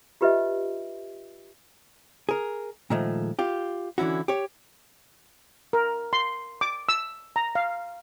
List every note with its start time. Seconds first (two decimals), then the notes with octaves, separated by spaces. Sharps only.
0.21 F4 G4 B4 D#5 E5
2.29 G#4 A#4
2.90 A#2 D#3 F3 G#3 A3
3.39 F4 G4
3.98 D3 E3 C#4 E4 F#4
4.28 G4 C#5
5.73 A#4
6.13 C6
6.61 D6
6.89 E6
7.36 A#5
7.55 F5